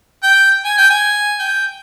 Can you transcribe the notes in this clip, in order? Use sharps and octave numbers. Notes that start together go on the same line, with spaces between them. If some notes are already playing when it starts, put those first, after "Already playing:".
G5
G#5
G5
G#5
G5